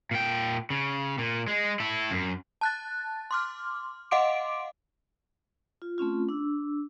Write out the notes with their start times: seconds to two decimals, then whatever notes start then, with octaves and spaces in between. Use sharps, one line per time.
0.11 A#2 G5
0.70 C#3
1.18 A#2
1.48 G#3
1.80 E4 A4
2.11 F#2
2.61 A5 F#6 A6
3.31 C6 D6 F6
4.11 D#5 F5 F#5 C6 D6 D7
5.82 F4
5.98 A3 C4 C#4 F4
6.29 D4 E6